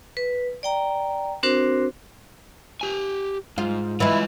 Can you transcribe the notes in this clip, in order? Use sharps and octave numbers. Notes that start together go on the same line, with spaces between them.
B4
D5 G5 A#5
C4 D4 F#4 A#4 C5
G4 G#5
G#2 F4
E3 G#3 E4 F4 B4